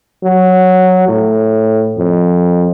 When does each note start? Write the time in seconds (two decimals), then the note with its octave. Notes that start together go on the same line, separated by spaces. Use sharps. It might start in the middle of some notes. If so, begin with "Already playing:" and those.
0.23 F#3
1.08 A2
1.98 F2